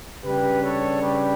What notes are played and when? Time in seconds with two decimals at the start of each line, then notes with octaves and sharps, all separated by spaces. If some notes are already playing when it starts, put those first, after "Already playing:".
0.25 C#3 G3 D4 G4 B4
0.63 A4 C#5
1.01 G4 B4